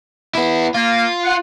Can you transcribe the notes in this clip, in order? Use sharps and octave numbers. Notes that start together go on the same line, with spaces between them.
B3 E4
A#3 F4
F#5